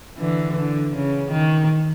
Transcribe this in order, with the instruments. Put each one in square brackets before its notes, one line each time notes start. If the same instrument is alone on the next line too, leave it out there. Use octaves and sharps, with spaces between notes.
[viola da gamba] D3 E3
D3
C#3
D#3